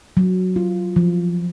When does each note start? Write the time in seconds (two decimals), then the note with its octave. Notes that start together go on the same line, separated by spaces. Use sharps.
0.17 F#3
0.56 F4
0.96 F3